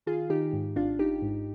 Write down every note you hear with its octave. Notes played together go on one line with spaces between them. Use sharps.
D#3 F4 G#4
D#3 D#4 G4
G#2
G#1 D4 F4
G#1 D#4 G4
G#2